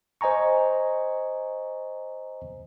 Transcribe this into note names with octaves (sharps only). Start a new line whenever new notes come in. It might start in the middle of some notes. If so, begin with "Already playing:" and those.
C5 D#5 G#5 A#5 C#6